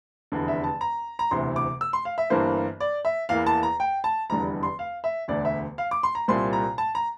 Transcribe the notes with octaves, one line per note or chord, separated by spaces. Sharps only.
F1 E2 D3
E5
A5
A#5
A#5
E1 D2 C3 E3 C6
D6
E6
C6
F5
E5
G1 G2 E3 A#3 C5
D5
E5
E2 E3 A#3 F5
A5
A#5
G5
A5
F1 E2 D3 G3 A#5
C6
F5
E5
E1 D2 D3 D5
E5
F5
D6
C6
A#5
C2 A#2 G3 C4 C6
A#5
A5
A#5